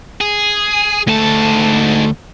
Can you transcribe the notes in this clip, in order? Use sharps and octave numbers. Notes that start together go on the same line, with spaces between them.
G#4
D2 G#2 A3 A5